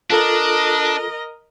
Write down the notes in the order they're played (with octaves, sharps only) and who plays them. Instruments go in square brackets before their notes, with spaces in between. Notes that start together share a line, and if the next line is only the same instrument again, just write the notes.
[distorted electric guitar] D4 [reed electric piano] F4 A4 [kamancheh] A#4 D#5